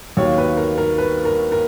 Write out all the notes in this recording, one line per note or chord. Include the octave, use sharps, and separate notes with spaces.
D#2 D#3 F#3 A#3 D#4 C#5
B4
A#4
A#4
B4
A#4
A#4